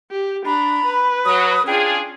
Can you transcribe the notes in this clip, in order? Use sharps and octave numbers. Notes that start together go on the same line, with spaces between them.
G4
D4 A#5 B5
B4
F#3 D#6
C#4 D4 F4 G#4 G5